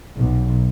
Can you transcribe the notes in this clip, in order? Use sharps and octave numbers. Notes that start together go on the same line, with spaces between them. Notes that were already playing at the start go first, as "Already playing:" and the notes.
B1